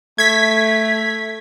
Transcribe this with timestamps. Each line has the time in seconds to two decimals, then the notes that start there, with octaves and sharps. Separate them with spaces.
0.18 A3 G#6 B6